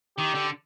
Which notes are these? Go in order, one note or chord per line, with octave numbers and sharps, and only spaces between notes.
D#3 G4
D3